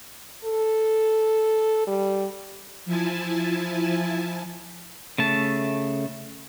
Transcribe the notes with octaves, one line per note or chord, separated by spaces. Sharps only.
A4
G3
F3 E4 G#5 A5
C#3 A3 A5